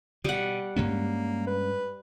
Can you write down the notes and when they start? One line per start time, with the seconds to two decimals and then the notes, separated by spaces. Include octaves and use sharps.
0.24 B2 G3 F#5
0.76 G2 G#3 A#3 C#4
1.47 B4